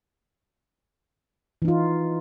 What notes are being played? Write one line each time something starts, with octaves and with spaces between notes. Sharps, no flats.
E3 D#4 F4